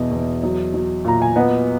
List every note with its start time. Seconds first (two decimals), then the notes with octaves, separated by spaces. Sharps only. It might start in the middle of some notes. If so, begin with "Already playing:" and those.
Already playing: E2 B2 D#5
0.11 E2
0.43 F#3
0.74 F#3
1.05 A#2 A#5
1.22 G#5
1.36 B3 D#5 F#5